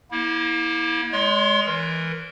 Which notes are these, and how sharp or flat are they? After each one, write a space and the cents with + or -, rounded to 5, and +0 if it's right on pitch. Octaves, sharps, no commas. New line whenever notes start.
A#3 +35 E4 -25
G#3 +0 C#5 +40 C6 +25
E3 +0 A#4 +0